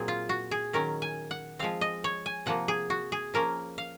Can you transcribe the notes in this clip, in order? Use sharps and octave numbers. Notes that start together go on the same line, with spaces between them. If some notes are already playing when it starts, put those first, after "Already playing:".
Already playing: A#2 F#3 C4 G#4
F4
F#4
G#4
D#3 F#3 C#4 A#4
G#5
F#5
F3 G#3 C4 F5
D#5
C#5
G#5
C3 F3 A#3 F#5
G#4
F#4
G#4
F3 A#3 C#4 A#4
F5